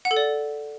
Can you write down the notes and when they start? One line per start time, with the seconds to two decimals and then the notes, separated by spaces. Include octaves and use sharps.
0.05 F#5
0.11 A4
0.16 D5